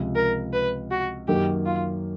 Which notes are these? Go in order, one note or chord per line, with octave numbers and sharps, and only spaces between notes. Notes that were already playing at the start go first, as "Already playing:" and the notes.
Already playing: C#2 C3 F3
A#4
B4
F#4
F#2 D#3 F#3 A#3 G4
F4